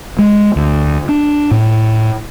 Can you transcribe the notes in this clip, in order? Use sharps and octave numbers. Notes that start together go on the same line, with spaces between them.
G#3
D2
D4
A2